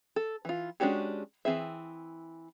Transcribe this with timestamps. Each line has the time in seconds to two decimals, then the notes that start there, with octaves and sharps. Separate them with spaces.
0.16 A4
0.45 E3 F4
0.80 G#3 C#4 D4 F#4 G4
1.45 E3 C4 G#4 E5